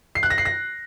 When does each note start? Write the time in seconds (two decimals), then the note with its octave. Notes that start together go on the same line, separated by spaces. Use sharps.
0.15 C7
0.23 F#6
0.30 A#6
0.38 C7
0.45 A#6